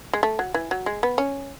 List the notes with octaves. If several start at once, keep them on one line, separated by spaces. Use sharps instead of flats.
G#3
A3
F#3
E3
F#3
G#3
B3
C#4